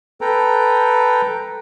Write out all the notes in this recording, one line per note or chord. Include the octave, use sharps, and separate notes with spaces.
A4 B4 G5 A#5